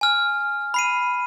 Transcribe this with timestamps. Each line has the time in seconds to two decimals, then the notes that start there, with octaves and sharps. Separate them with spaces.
0.01 G#5 F6
0.74 B5 C7 D#7